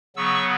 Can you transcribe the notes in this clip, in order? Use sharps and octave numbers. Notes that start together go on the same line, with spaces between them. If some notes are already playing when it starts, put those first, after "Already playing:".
C#3 F#3 B3 C#6 E6